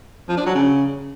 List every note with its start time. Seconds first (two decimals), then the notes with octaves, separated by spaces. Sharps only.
0.28 F3
0.37 D4
0.46 F#3
0.55 C#3